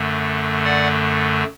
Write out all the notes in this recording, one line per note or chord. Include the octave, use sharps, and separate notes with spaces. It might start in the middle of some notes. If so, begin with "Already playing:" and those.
Already playing: F#2 D3 A3
D5 F#5